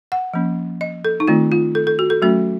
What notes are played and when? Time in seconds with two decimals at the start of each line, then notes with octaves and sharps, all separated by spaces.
0.12 F#5
0.34 F3 A#3 C#4
0.81 D#5
1.05 A4
1.20 D#4
1.28 D#3 A3 C4 F4
1.52 F4
1.75 A4
1.87 A4
1.99 F#4
2.10 A4
2.22 F#3 A3 C#4 F#4